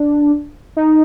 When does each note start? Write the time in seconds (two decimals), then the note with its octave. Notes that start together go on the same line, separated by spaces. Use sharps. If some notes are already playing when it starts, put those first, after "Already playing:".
Already playing: D4
0.76 D#4